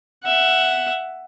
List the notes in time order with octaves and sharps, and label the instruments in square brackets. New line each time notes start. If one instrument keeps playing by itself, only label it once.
[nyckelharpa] E5 F#5